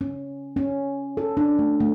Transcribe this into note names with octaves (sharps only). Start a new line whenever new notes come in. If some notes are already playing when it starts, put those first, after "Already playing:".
C#4
C#4
A4
D4
A3
A3